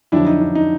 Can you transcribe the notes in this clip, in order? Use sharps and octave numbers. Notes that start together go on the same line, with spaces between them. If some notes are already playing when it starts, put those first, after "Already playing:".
F2 D3 F#3 D4 E4
D#4
D4
D#4